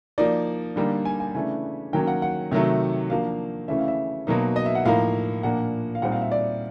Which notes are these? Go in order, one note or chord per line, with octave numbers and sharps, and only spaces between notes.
F3 A#3 D#4 D5
D3 G3 A#3 D#4
G#5
G#5
C#3 E3 A3 D4 G#5
D#3 F#3 A#3 C#4 G5
F#5
F#5
C3 D#3 F#3 A3
F3 A#3 D4 F5
C#3 E3 A3 C#4 E5
F5
E5
B2 F#3 A#3 D#4
D#5
E5
F#5
A2 F3 A#3 D#4 F5
A#2 F3 A#3 D4 F#5
F5
A#2 G3 C4 D#4 F#5
F5
E5
D5